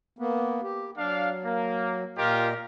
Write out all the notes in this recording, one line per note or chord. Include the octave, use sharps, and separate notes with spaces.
A#3 B3
G4
F#3 D4 F5
A#3
A#2 F4 G4 A#4 D#5